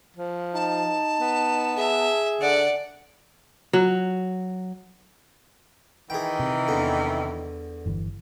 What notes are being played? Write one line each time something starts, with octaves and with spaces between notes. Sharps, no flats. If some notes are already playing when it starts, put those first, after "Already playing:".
F3
D#4 A5
B3
G#4 E5
D3 D5 F#5
F#3
D#3 E3 G#4 G5
C3
E2 D3
G1 E3